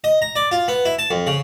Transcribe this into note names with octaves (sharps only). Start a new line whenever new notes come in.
D#5
A#5
D5
F4
B3
E4
A5
F2
C#3